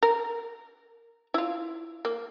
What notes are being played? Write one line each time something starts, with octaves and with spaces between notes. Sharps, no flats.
A#4
E4 F4
A#3